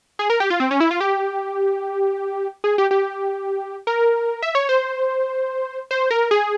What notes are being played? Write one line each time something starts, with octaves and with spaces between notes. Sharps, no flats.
G#4
A#4
G4
F4
C4
C#4
E4
F4
G4
G#4
G4
G4
A#4
E5
C#5
C5
C5
A#4
G#4